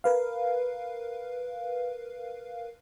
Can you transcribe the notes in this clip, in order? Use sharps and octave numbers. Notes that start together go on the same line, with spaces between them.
A#4 B4 F5